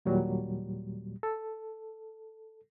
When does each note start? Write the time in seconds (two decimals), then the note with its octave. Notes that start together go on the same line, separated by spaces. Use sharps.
0.05 D#2 A#2 F#3 G3
1.23 A4